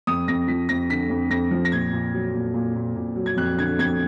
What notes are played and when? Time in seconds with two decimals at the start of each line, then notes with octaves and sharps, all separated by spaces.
0.07 F2 D#6
0.28 F2 A#6
0.48 F3 B6
0.69 F2 A#6
0.89 D3 B6
1.10 F2
1.30 F2 A#6
1.51 F3
1.65 A#6
1.72 A#2 G#6
1.93 A#2
2.13 F#3
2.34 A#2
2.54 A#2
2.76 A#2
2.96 A#2
3.16 F#3
3.26 G#6
3.37 F2 F#6
3.58 D3 G#6
3.79 F2 G#6